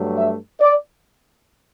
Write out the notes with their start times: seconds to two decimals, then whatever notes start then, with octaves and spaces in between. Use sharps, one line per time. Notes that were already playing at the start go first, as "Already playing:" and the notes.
Already playing: G2 F#3 A3
0.18 E5
0.61 D5